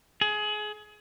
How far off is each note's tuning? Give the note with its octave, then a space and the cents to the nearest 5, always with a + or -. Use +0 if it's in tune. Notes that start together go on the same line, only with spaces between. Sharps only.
G#4 +25